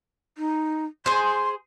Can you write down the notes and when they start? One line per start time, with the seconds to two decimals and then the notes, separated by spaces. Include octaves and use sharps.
0.38 D#4
1.06 G#4 C5 C6